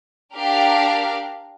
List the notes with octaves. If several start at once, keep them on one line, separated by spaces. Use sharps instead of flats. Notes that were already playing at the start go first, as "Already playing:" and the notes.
D4 G4 A#4 F5